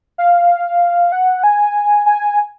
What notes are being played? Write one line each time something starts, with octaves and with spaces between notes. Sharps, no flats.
F5
F#5
G#5
G#5